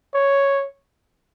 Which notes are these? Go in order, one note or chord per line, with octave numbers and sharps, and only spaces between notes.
C#5